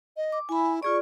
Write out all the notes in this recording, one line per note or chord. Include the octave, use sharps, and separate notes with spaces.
D#5
D6
E4 G#5 B5
F4 G#4 D5 C#6